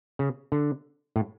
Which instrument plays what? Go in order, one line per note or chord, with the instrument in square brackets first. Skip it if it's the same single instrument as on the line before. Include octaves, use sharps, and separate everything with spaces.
[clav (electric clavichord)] C#3
D3
A2